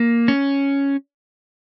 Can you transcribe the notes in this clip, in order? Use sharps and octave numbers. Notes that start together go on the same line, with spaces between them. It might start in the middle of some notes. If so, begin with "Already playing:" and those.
Already playing: A#3
C#4